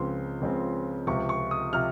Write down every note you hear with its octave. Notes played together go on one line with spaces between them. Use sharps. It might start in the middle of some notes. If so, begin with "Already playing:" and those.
Already playing: C#2 C#3 F3 C4 C6
C#2 C#3 F3 C4
C#2 C3 F3 C#6
C#6
D#6
C3 F3 F6